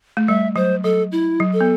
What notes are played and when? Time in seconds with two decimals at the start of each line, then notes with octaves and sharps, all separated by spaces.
0.17 A3
0.28 G3 E5
0.56 F#3 C5
0.84 F#3 A4
1.12 E4
1.40 F#3
1.53 A4
1.61 B3